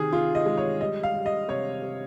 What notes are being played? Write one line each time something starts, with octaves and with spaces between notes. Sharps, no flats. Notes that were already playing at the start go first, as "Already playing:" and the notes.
Already playing: C3 D#3 G#4
C3 F4
D#5
G#3
C#5
G3 D#5
F5
G3
D#5
C3 C#5
C3